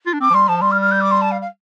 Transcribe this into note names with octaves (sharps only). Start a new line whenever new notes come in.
F4
D4
C4 D6
F3
G3 C6
F3 A5
G3 C6
F6
F6
G6
D6
C6
A5
F5
F5